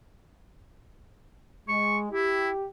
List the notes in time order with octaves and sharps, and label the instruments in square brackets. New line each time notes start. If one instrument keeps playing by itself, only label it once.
[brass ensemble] G#3 [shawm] C#6
[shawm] E4 [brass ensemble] G4